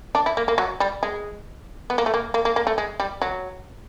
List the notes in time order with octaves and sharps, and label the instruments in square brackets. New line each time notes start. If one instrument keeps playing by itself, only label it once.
[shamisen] D4
E4
A#3
A#3
F#3
G3
G#3
B3
A#3
A3
A#3
A#3
A#3
A#3
A3
G#3
G3
F#3